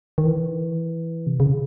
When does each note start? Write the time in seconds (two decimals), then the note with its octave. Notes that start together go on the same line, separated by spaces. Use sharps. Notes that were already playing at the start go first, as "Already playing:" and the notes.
0.18 D#3
0.26 E3
1.27 C3
1.40 C#3